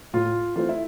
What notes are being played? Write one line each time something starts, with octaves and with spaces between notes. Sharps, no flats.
A2 F4
E3 A3 C4 F4
E4